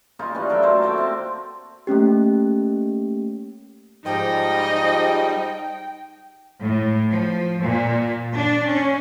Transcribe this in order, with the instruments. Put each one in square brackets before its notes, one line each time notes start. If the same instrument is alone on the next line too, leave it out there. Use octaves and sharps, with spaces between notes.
[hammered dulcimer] C#3 A#3 D#4 F4
E3 G3 C#4 D4
F#3 A3 A#4 G5
A#3 C5 A5
A3 A#3 G5 D6
C4 C6
[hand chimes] A3 A#3 C#4 G4
[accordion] G#2 F3 G3 [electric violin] D#4 [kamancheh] D#5 [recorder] G5
[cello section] A2
F3
A#2
D4
C#4